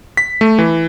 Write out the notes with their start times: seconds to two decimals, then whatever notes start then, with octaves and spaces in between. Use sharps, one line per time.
0.17 B6
0.41 A3
0.58 E3